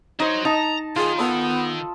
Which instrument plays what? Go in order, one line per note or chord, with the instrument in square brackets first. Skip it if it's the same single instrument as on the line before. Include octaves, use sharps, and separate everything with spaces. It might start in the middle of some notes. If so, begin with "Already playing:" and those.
[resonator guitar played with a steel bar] D#4 C5 [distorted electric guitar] F#4 C#5
[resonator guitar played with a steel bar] D#4 [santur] A5 [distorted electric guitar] A#5
[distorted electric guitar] D#3 [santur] F4 [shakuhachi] G#4
[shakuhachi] B3 [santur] A4 D#5 B5